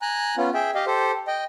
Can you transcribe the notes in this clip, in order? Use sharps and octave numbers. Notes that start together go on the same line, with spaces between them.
G#5 A#5 F#6
B3 C#4 F4
G#4 E5 G5
G4 D#5 F5
G4 A4 C5
D#5 G5